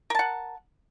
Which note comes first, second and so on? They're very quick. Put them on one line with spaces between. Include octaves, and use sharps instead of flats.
A#4 A5 F#5